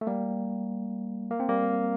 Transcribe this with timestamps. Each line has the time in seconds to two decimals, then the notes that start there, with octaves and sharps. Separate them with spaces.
0.01 A3
0.07 G3 A#3
1.31 A#3
1.40 C4
1.49 G3 A#3